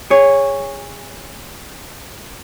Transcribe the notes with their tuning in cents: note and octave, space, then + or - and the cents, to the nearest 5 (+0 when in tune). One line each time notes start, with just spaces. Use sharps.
G#4 -25 C#5 +0